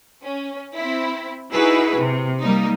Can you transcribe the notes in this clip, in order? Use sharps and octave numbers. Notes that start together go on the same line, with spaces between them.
C#4
C4 E4
D#4 E4 F#4 G#4 B4
C3
G3 A#3 D#4